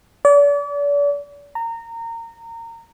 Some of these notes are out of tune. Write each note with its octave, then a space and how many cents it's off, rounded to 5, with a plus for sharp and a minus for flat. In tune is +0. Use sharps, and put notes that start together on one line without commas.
D5 -40
A#5 -25